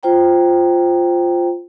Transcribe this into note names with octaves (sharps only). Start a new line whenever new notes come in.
F4 C5 G5 A#5